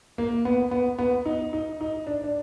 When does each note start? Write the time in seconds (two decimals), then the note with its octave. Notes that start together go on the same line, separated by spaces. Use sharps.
0.18 A#3
0.45 B3
0.71 B3
0.99 B3
1.25 D#4
1.53 D#4
1.81 D#4
2.07 D4
2.24 D4